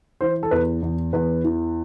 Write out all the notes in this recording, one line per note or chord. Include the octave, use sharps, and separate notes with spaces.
E3 C5
A4
E2 B4
E2
E2 B4
E3